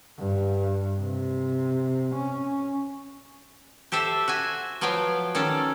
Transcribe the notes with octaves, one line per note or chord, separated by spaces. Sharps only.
G2
C3
C#4
G4 A4 C5 E5
F#4 E5 G#5
F3 F#3 B3 F5 G5
D#3 C#4 A4 D5